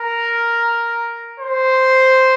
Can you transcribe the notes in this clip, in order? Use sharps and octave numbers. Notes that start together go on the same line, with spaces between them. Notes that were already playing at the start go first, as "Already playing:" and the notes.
Already playing: A#4
C5